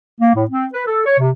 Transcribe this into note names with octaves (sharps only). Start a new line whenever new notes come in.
A#3
A2
C4
B4
A4
C#5
C3